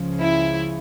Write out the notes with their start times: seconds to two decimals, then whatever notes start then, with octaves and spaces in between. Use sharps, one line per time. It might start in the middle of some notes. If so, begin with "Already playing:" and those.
Already playing: C#2 C#3 F3
0.20 E4